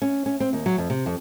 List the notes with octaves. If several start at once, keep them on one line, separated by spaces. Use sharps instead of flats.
C#4
C#4
C4
D#2
F#3
F2
C3
F2